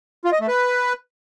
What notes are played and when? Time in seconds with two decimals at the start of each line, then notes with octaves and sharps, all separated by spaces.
0.25 F4
0.32 D#5
0.40 A3
0.48 B4